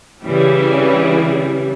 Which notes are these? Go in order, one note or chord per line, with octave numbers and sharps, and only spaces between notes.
C#3 E3 G3